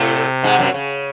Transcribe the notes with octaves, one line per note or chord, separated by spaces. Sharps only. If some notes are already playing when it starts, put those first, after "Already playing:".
Already playing: A2 C3 A3
G#2 G#3
F#2 F#3
C#3